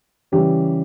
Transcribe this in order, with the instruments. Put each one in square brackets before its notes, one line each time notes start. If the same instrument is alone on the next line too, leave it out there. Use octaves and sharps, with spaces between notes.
[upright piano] C#3 E3 G3 C#4 G4